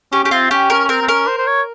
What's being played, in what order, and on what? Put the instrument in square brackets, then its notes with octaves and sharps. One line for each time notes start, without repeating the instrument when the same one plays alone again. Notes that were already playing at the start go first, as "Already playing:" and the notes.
[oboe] C#4 [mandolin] G4
[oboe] C#4 [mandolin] G4
[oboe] C4 [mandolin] F4
[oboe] C#4 [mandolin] G4
[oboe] C#4 [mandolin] A#4
[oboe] C#4
[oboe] C4 [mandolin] A#4
[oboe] C4
[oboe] C#4 [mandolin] A#4
[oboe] C5
C5
C#5